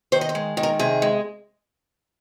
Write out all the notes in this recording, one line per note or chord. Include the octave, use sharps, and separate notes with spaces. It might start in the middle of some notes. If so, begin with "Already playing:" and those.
D#3 C5
D#5
C5
G#3
D#3
A#4
C3 G#4
G#3